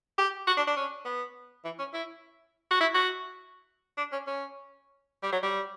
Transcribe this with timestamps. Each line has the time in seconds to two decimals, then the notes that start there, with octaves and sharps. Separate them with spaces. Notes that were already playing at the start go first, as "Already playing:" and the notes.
0.18 G4
0.47 F#4
0.57 D4
0.67 D4
0.77 C#4
1.05 B3
1.65 E3
1.79 C#4
1.94 E4
2.71 F#4
2.81 E4
2.95 F#4
3.98 D4
4.12 C#4
4.27 C#4
5.23 G3
5.33 F#3
5.43 G3